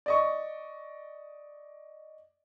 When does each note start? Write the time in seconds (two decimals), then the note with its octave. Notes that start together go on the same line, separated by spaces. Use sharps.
0.06 D5 D#5 C#6